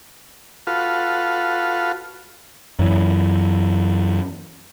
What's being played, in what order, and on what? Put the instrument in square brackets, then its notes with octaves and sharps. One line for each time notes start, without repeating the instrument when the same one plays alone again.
[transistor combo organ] F4 F#4 A4 B4 F5
[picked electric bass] F#2 E3